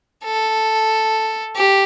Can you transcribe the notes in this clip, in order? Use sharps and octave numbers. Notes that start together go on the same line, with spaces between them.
A4
G4